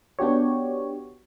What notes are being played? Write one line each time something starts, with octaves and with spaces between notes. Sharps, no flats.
B3 D4 F#4 G4 C#5